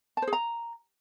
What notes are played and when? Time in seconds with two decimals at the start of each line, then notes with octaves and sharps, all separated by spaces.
0.17 A5
0.22 C5
0.27 G#4
0.33 A#5